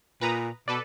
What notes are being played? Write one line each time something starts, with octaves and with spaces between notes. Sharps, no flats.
A#2 B4 A#5 D#6
B2 A4 B4 D5